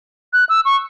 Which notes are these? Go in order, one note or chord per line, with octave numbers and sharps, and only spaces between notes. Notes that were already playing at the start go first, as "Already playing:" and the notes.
F#6
E6
C#6